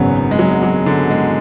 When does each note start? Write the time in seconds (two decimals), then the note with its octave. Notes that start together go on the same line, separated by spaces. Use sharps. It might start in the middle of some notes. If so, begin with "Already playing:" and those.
Already playing: G#1 F#2 C#3 F#3 B3
0.31 G#3
0.39 F#3
0.63 F#3
0.86 D3
1.10 G#3